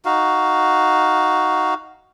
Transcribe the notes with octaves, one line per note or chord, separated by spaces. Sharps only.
D#4 F#4 F5